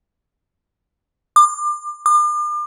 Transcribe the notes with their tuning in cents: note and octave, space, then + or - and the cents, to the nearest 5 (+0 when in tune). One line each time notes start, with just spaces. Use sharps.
D6 +30
D6 +40